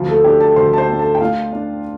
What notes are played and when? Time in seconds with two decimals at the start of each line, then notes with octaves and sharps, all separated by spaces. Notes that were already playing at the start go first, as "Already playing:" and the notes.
Already playing: D2 F3 F4
0.09 A3 A4
0.24 D4 G4 G5
0.40 A4 A5
0.56 D2 C5 C6
0.73 A5
0.78 C5 C6
0.89 D4
0.99 A4 A5
1.15 G5
1.20 A3 F4 F5
1.52 D4